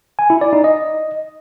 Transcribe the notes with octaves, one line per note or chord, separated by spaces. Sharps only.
G#5
E4
D5
D#4
D#5